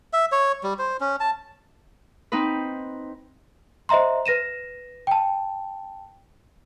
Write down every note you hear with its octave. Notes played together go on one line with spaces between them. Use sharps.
E5
C#5
G3
C5
C#4
A5
C4 D#4 B4
C5 D#5 E5 A#5 C6
B4 A#6 D#7 E7
G5 A5